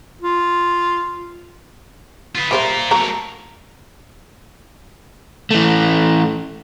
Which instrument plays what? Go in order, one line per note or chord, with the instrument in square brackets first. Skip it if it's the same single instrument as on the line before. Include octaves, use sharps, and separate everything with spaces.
[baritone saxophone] F4
[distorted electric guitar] F4 B4
[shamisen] G3 C5 E5 [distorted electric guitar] F4 A#4
[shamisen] F#3 A#3 A#5 [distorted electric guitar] A3 A#4
[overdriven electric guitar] E3 A3